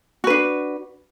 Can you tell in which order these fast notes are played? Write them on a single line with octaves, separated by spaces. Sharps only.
F#4 B4 D4